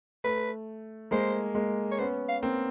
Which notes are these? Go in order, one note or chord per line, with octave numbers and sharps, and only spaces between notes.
A3 B4
G#3 A#3 C5
G#3 A#3
C#5
B3 C#4 C5
F5
A#3 C4